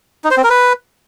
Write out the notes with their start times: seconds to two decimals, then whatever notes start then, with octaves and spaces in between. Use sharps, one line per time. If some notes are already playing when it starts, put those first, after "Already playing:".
0.24 D#4
0.31 C5
0.37 C4
0.44 A#4
0.50 B4